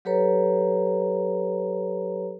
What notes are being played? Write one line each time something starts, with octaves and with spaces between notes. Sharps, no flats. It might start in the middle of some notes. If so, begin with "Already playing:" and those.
F#3 G4 A4 B4 C#5 A#5